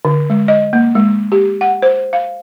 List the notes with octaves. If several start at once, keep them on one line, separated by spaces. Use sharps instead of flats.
D3
G#3
D#5
A#3
G#3
G4
F#5
C5
F5